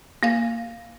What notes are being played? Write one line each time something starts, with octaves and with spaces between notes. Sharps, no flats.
A#3 F5 A#6